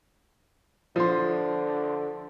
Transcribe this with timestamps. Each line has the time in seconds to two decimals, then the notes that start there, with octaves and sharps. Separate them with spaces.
0.96 D3 F3 C6